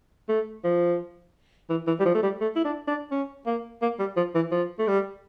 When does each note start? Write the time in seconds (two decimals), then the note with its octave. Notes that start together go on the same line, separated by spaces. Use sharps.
0.29 A3
0.64 F3
1.70 E3
1.87 E3
2.00 G3
2.05 F3
2.15 A3
2.23 G3
2.41 A3
2.56 E4
2.65 D4
2.88 D4
3.11 C#4
3.46 A#3
3.82 A#3
3.99 G3
4.17 F3
4.35 E3
4.52 F3
4.79 A3
4.88 G3